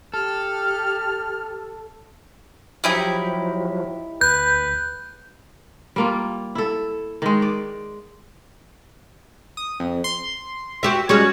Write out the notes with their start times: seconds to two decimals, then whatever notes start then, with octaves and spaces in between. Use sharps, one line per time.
0.14 G4 A4 F6
2.84 F3 F#3 D#4 E4 G4
4.21 D2 B4 G6
5.96 G3 A#3 F4
6.55 E4 A4
7.22 D#3 G#3
7.42 D5
9.57 D#6
9.80 F2
10.04 C6
10.83 F#4 G4 E5
11.09 G3 G#3 C#4 F#4 G#4